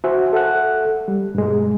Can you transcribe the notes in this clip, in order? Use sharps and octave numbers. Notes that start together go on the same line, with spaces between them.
F#4 C5 E5 F#5 G#5
A4 E5 F#5 F#6
G3
G2 B2 G#3